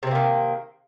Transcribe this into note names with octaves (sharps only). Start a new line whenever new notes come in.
C3 D#3 A#3 C4